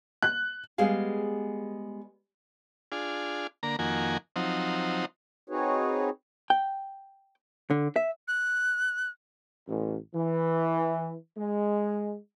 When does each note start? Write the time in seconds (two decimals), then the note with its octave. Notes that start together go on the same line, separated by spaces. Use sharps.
0.23 F#6
0.78 G3 G#3 B3 G#4 F5
2.92 D4 F4 G#4
3.63 D3 A#3 A#5
3.79 F2 D#3 A#3 F#4 G#5
4.36 F3 F#3 C4 D#4
5.50 C4 D#4 F#4 G#4 B4 C#5
6.50 G5
7.71 D3
7.96 E5
8.28 F#6
9.67 A1
10.13 E3
11.36 G#3